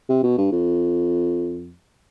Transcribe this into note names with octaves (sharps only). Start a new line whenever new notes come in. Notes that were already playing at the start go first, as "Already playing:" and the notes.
C3
B2
G2
F2